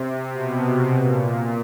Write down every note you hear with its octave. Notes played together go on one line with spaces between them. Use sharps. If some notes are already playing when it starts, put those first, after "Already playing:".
Already playing: C3
B2
A#2